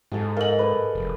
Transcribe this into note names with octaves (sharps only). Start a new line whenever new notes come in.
G#2 G#4 A4
A4 A#4 D#5 F5 F#7
B4 D5
F1